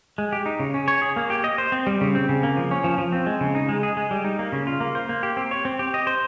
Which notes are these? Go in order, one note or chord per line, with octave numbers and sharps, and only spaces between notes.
G#3
G4
D#4
C#3
C#4
C#5
G#4
A#3
G4
D#5
C5
C4
G3
C#3
C4
C#3
A#3
F3
C#4
F3
F3
C4
G#3
C#3
D#4
G#3
G#4
G#3
G3
D#4
A#3
C#3
F4
A#3
C5
A#3
G4
C4
C#5
C4
G4
D#5
C5